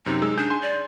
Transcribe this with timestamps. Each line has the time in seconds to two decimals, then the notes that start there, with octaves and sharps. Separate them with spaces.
0.06 F#2 C3 D#4
0.22 G#3 E6
0.38 D4 G#4 G6
0.50 G#5 C6
0.62 D5